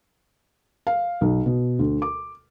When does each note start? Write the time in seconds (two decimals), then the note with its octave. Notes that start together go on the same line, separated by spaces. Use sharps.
0.87 F5
1.21 B1
1.46 B2
1.79 D2
2.02 D6